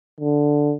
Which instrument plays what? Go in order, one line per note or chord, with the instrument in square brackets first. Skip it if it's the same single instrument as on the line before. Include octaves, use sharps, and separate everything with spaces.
[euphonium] D3